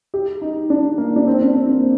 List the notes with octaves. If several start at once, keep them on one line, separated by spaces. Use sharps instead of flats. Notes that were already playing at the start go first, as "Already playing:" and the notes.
G4
D#4
D4
A#3
D4
C4
D4
C4
A#3